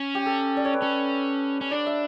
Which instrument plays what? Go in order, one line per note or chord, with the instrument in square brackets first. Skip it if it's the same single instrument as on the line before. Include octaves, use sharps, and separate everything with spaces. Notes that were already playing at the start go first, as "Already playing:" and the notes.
Already playing: [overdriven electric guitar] C#4
[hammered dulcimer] G4
A4
D5
C#5
B4
[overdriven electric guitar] C#4 [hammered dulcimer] A4
[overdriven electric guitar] C#4
[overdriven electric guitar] D4 [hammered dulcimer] D5
[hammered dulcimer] E5